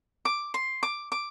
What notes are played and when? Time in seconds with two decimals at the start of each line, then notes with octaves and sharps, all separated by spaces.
0.25 D6
0.54 C6
0.83 D6
1.12 D6